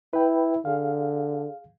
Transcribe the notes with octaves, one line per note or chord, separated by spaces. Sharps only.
E4 B4 G5
D3 G#4 F5